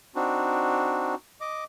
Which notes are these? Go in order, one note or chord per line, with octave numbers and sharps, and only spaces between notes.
C4 D4 D#4 F#4
D#5 D6